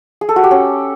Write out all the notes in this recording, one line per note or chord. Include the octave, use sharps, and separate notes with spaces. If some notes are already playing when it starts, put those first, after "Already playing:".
G#4
A4
F#4
G4
C#4